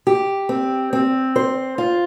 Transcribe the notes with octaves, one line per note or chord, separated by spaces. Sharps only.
G4
C4
C4
C5
F4